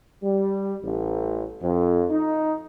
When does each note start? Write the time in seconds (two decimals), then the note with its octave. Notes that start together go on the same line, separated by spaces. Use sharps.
0.23 G3
0.83 A1
1.62 F2
2.10 D#4